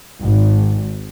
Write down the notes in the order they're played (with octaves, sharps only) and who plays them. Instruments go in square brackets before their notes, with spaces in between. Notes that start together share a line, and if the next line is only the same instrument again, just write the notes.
[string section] G#1